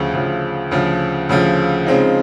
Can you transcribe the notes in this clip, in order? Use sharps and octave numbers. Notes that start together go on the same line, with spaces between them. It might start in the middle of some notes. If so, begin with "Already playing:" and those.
Already playing: D2 C#3 F3
D2 C#3 F3
D2 C#3 F3
D2 C#3 F3
C#3 F3 G#3 C4 D#4